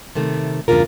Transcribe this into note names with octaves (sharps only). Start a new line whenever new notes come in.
C3 D#3 A3
E2 G2 C#3 D4 F4 A#4